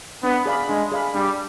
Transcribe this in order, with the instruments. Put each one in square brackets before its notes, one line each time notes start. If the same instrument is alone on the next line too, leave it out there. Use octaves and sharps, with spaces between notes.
[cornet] B3 [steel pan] D4
[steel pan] G#4 D5 F5 B5
[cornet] G#3 [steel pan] D4
[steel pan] G#4 D5 F5 B5
[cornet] G3 [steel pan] D4